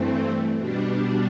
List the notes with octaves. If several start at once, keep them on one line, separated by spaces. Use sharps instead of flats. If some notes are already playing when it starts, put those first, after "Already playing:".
Already playing: G2 E3 A3 C4
B2 G3 D4